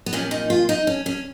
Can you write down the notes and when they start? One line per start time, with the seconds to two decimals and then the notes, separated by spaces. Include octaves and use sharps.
0.06 B3
0.13 A#2 F3 C#4
0.31 D#4
0.50 F4
0.69 D#4
0.87 C#4
1.06 C#4